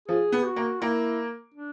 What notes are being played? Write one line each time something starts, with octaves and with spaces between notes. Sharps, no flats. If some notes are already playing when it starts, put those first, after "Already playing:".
F3 G#4
B3
F#4
A#3
A#3 E4
D4